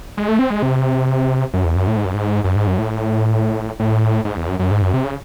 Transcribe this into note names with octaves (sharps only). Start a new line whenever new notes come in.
G#3
A3
C4
G#3
C3
F#2
E2
F#2
A2
G#2
F#2
G#2
F#2
G#2
F#2
A2
A2
G#2
E2
F#2
F#2
G#2
F#2
C3
C#3